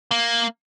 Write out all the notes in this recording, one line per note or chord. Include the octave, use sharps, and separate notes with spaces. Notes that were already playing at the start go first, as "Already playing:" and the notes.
A#3